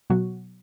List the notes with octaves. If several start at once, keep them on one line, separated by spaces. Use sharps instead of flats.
B2 F#3 F#4